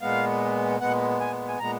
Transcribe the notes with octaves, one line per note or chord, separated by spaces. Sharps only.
A#2 G#3 B3 F5
A#2 G#3 B3 F#5
G#5
G#5
A#2 G#3 B3 A#5